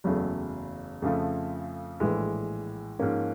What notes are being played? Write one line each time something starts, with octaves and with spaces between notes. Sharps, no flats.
F#1 E2 C#3 F#3 A3
F2 C#3 F3 A3
A#1 A2 E3 G#3
G#2 F3 A#3 C#4